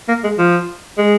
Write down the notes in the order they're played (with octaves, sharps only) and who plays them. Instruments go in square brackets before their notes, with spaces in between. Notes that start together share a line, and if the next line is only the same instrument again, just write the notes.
[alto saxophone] A#3
G#3
F3
G#3